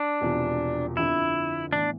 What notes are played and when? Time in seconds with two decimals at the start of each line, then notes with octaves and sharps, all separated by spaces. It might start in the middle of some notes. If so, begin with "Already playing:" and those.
Already playing: D4
0.21 E1 E2 C3 F3
0.97 G1 F2 D3 F3 E4
1.73 A2 E3 B3 D4